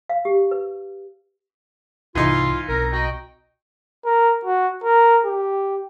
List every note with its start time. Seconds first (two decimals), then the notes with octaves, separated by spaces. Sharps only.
0.10 F5
0.25 G4
0.51 B4
2.15 C2 G#2 C3 E3 D#4 F4 C6
2.69 B1 C4 A#4 A#5
2.93 F#4 D#5 G5 A#5
4.05 A#4
4.45 F#4
4.84 A#4
5.25 G4